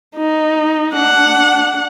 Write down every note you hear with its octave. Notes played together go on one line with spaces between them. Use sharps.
D#4
D4 F#5